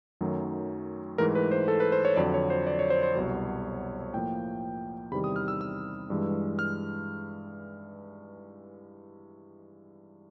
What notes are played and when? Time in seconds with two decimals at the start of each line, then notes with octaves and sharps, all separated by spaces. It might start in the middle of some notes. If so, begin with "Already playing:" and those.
0.21 F#2 D#3 F#3 A3
1.18 G#2 E3 A3 A#4
1.35 B4
1.51 C5
1.68 A4
1.80 B4
1.92 C5
2.05 C#5
2.16 F2 D3 F#3 D5
2.34 C#5
2.50 C5
2.67 D5
2.79 C#5
2.90 C5
3.03 C5
3.15 C2 B2 F#3 C#5
4.13 A2 F3 A#3 G5
5.11 E2 C3 D#3 G3 B5
5.24 D#6
5.36 F6
5.48 E6
5.61 E6
6.10 G2 E3 G#3
6.59 F6